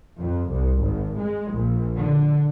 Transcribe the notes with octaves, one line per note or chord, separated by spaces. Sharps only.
F2
C2
G#1
G#3
A#1
D3